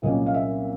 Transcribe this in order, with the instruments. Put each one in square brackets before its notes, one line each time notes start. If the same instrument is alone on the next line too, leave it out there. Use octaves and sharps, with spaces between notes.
[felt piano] C2 A#2 F#3 A#3 C#4 D#5
F5
E5